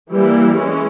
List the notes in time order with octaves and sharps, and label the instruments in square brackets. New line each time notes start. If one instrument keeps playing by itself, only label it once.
[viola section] E3 G3 A#3
E3 G#3 C#4